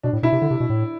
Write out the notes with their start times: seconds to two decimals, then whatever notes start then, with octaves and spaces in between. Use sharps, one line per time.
0.03 B2 D4
0.13 A2
0.23 B2 E4
0.32 C3
0.42 D3
0.50 C3
0.60 B2
0.70 A2